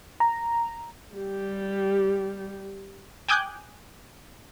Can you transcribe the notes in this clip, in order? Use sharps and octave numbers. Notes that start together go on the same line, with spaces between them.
A#5
G3 G4
G5 G#5 D6 D#6 F#6 G6